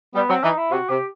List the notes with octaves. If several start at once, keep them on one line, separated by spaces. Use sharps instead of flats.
G3 B3
F#3 C4
E3 D#4
E4
C3 F#4
C3 G4